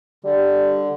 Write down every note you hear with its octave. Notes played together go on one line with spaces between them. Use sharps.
D3 G3